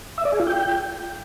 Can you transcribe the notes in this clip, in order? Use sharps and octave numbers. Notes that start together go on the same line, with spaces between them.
E5
D5
G#4
F4
G5